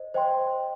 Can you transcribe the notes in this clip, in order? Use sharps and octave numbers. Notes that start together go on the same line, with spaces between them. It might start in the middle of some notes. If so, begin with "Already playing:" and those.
Already playing: C5 D#5
C5 D#5 G5 C6